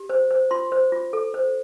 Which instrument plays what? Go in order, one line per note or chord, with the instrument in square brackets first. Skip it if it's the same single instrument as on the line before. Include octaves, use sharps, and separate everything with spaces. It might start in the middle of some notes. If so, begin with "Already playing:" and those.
Already playing: [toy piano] G4
C5
C5
F4 C6
C5
F4
A4
C5